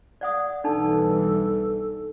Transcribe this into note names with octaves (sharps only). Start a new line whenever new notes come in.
D5 F#5 D#6
B1 E3 G3 D4 D#4 A4 A5